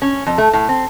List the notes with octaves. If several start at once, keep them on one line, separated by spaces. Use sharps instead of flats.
C#4
F2
A3
A2
C4